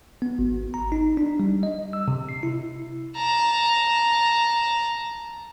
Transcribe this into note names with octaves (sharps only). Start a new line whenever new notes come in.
B3
G#1
A#5
D#4
D4
G3
D#5
E6
C3
C7
E4
A5 A#5